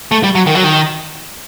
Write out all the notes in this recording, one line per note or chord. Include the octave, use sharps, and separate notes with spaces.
A3
G3
F#3
D#3
F#3
D#3